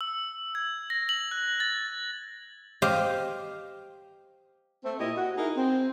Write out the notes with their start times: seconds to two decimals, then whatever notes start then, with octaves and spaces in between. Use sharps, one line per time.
0.01 E6
0.55 G#6
0.90 A#6
1.09 F#7
1.31 F#6
1.60 A6
2.82 G4 C5 D#5 F5
4.84 A3 C4
4.99 A#2 E4 G4 D#5
5.17 F#4
5.37 D#4 E4 G#4 A#4
5.56 C4